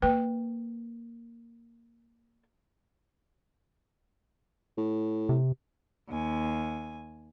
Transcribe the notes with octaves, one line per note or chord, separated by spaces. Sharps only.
A#3 B4 G5
A2
C3
D#2 G#5